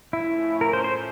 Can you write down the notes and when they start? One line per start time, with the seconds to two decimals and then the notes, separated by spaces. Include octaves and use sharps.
0.12 A2 F3 A3 C#4 E4
0.61 A#4
0.73 C5
0.84 C5